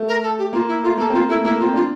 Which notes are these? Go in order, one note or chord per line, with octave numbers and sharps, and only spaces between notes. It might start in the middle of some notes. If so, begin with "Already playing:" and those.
Already playing: A3
A#4
A4
G4
A#3 F4
E4
A3 F4
A#3 A4
C4
A#3 F4
A3 E4
A#3 E4
F4
C4
D4 F4